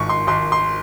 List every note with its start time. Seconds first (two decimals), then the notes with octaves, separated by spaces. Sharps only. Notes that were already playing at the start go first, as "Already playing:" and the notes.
Already playing: G#1 G#2 C#6
0.09 C6
0.27 G#1 C6
0.52 C6